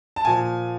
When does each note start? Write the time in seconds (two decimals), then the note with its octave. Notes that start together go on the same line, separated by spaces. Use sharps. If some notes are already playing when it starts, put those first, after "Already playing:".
0.16 A5
0.25 A#2 F3 G#5